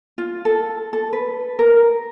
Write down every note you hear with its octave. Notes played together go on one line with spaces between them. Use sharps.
F4
A4
A4
B4
A#4